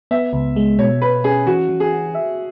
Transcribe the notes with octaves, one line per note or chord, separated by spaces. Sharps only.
B3 E5
C#2
G#3
B2 C#5
B2 B4
C#4 G#4
E3 F#4
E3
G#4
F#4
E5